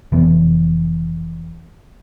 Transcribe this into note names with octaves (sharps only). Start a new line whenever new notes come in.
F1 E3 B3